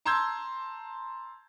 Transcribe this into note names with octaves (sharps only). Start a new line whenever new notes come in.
A5 A#5 C6 E6 G6 G#6